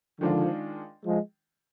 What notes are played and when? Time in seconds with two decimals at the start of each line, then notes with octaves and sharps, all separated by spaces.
0.21 D3 D#3 F3 G#3 D4 F4
1.05 F3 G#3